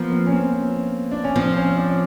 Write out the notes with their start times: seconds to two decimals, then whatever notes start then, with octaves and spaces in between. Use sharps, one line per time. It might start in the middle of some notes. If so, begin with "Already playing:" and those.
Already playing: F3 A#3 B3
0.12 C4
0.27 C#4
0.32 C4
1.11 D4
1.24 C#4
1.36 F3 C4
1.56 C#4
1.77 D4